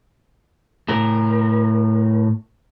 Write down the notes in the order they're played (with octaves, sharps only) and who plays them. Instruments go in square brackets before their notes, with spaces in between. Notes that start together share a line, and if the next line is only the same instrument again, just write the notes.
[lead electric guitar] A2 A#4